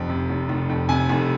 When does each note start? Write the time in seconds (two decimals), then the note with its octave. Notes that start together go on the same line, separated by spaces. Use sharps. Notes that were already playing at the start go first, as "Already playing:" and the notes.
Already playing: F1 F2
0.09 C3
0.30 F1
0.49 F1
0.69 F2
0.89 C3 G#5
1.09 F1